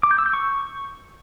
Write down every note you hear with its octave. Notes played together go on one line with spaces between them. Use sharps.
D6
G6
E6
G6
C#6